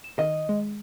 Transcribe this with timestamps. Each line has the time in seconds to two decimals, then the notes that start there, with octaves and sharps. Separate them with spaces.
0.04 E7
0.19 D#3 D#5
0.49 G#3